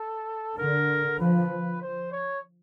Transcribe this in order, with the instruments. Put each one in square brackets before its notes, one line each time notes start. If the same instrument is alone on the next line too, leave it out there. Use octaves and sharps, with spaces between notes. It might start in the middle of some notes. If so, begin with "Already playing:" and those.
Already playing: [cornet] A4
[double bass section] D3 [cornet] A#4
[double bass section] F3 [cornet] B4
[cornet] C5
C#5